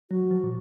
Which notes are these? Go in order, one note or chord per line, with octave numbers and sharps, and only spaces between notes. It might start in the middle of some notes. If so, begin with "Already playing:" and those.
F#3 F#4
F3
A#2